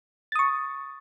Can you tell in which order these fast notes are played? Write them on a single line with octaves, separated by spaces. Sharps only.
A6 D#6 C#6